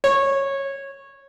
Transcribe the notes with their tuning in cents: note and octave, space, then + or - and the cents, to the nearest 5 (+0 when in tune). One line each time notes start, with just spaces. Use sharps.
C#5 -15